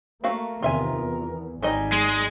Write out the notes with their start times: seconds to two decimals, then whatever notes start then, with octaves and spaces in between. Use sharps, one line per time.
0.24 A3 A#3 F#4 A#4 F5
0.62 E2 C3 D#3 F4 E5 G#5
0.94 E2
1.62 G#1 G3 D#4 D#5 G#5
1.93 G#3